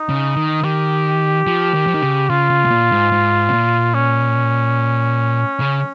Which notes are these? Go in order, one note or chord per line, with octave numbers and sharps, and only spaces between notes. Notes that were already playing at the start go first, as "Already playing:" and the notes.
Already playing: D#4
C#3
D#3
D#3 G4
F3
D#3
F3
D#3
C#3
C#3 F4
C#3
C3
A#2
G#2
G#2
C3
A#2
C#4
C#3